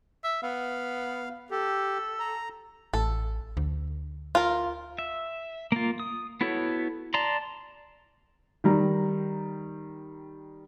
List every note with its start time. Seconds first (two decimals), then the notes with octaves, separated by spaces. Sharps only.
0.24 E5
0.43 B3 F5
1.51 G4 A4
2.20 A#5
2.94 A1 A4
3.57 D2
4.35 F4 A#4
4.99 E5
5.72 A#3 F4
6.00 D#6
6.41 B3 E4 F#4 A4 C#5
7.14 D5 A5 A#5 C6
8.64 D#3 G3 A#5